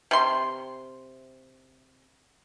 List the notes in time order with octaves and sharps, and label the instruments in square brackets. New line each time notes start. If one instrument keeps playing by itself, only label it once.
[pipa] C3 C6